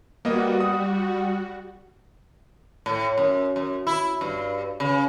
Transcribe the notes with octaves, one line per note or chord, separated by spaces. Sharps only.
G3 A#3 B3 F#4 D#5
D#6
A2
F#2
F#2
E4
G2
C#3